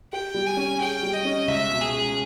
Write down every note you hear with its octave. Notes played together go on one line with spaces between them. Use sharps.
G4 G5
G3
G#5
C#4
G#4 G5
G3
D#5
C#4
C#2 E5
B2
G#4
G#3